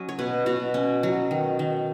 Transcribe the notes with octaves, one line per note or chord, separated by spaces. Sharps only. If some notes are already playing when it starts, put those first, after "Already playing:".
Already playing: F#3 C#4 D#5
C#5
B2 B4
B2 F#4
C#4
F#3
D#3
D#3